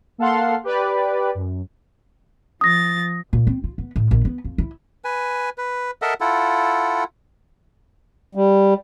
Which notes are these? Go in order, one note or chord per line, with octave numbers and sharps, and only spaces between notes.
A#3 A4 F5 F#5 C6
G4 B4 D5
F#2
F3 D#6 A6 A#6
A#2
C4
F4
B3
A2
A#1
B3
F2
E4
B4 G#5
B4
A4 A#4 D#5 E5 F#5
E4 F4 A4 F#5
G3